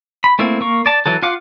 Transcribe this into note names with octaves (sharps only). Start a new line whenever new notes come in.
B5
A3 A#3 C4 E4
A#3 C#6
D5 A5
E3 F#3 A4
F4 F5 F#5 D6